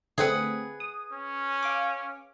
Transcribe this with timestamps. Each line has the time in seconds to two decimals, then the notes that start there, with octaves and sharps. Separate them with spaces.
0.18 D3 A3 C4 G#4 B4 F#5
0.80 D#6
1.13 C#4
1.63 F5 D6